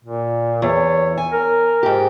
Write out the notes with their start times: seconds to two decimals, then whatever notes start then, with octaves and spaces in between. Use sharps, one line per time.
0.04 A#2
0.62 E2 C#5
1.17 G#5
1.32 A#4
1.83 G#2 G4